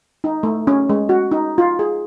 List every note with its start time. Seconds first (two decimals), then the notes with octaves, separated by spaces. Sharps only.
0.24 D#4
0.43 A3
0.67 C#4
0.90 G#3
1.09 F#4
1.31 D#4
1.58 F4
1.79 G#4